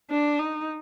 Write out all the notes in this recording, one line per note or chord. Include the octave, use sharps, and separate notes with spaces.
D4
D#4